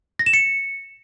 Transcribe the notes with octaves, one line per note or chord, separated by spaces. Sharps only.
A#6
E7
C#7